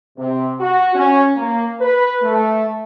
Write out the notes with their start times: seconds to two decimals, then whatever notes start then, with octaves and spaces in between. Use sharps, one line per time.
0.18 C3
0.60 F#4
0.95 C#4
1.36 A#3
1.81 B4
2.22 A3